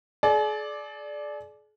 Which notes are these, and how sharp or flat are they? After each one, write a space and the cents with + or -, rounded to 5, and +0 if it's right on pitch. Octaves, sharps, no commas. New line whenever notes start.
G#4 +45 D5 +0